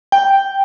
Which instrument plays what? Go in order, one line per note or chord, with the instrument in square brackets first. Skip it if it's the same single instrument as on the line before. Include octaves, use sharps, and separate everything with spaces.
[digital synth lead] G5